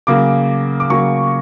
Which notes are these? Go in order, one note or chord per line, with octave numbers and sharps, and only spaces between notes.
C#3 F#3 A#3 D6
D6
C#3 F#3 A#3 C#6